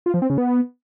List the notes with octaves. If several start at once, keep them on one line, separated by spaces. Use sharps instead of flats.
F4
F3
C4
C#3
B3